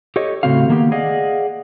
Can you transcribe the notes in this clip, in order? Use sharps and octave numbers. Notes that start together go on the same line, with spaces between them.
G4 A4 C#5 D#5
A2 C#3 A3 C4 F#4 F5
D#3 A#3 B3 G4
G#4 D5 D#5 F5 F#5